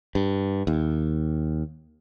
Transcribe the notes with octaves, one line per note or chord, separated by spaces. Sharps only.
G2
D#2